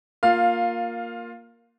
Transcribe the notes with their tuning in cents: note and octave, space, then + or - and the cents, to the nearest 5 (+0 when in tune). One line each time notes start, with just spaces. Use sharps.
A#3 +0 F4 +15 F5 +0